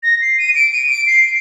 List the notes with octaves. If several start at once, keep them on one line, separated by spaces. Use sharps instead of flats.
A#6
C7
D#7
D7
D#7
D7
C7